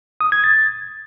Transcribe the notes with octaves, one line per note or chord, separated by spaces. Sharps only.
D#6
G#6
A6